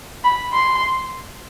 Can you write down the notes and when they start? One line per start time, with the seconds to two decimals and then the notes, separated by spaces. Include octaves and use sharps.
0.24 B5
0.53 C6